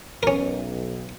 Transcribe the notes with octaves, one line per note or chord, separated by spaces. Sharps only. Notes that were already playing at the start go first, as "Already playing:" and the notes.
B1 C#4 A#4